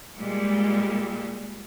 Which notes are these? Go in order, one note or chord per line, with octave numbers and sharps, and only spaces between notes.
A#2 G3 G#3